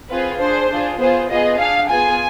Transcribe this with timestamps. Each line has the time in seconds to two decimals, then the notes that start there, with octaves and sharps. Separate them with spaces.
0.09 C4 F4 G#4 B4
0.39 D4 G#4 C5
0.69 D4 F4 G#4
0.99 B3 F4 G#4 C5
1.29 B3 F4 G#4 D#5
1.58 D4 G#4 F5
1.88 B3 F4 G#4 G#5